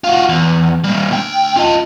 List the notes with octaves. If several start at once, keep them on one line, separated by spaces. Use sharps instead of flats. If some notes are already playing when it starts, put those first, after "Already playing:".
F4 F#4
E2
G3 A#3
D2 G5
F4 D#5